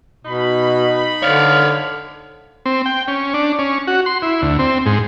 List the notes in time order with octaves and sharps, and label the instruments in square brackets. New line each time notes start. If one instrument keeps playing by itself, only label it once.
[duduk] B2 [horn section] D#4 B5
[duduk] D3 [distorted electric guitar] C#5 D5 [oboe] F5
[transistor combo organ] C4
G5
C#4
D4
C#4
F#4
C6
E4
D2
C4
G#2